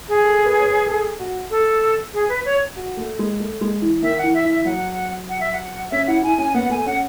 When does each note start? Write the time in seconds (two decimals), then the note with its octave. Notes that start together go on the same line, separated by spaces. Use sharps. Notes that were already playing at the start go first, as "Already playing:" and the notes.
0.09 G#4
0.24 A4
0.46 B4
0.59 C#5
0.67 B4
0.87 A4
1.19 F#4
1.51 A4
2.14 G#4
2.29 B4
2.45 C#5
2.76 F#4
2.97 A3
3.19 G#3
3.40 A3
3.61 G#3
3.82 E3
4.02 D#3 E5
4.18 F#5
4.24 E3
4.34 E5
4.45 E3 E5
4.65 F#3 F#5
5.29 F#5
5.40 E5
5.53 F#5
5.91 C#4 E5
6.07 E4 F#5
6.23 E4 G#5
6.38 C#4 G#5
6.54 B3 F#5
6.70 A3 G#5
6.86 C#4 F#5